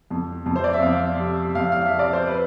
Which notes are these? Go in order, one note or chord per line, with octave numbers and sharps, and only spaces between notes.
F2
F2
C5
D5
E5
F2 F5
C3
F2 F5
F5
E5
C3
D5
C5
B4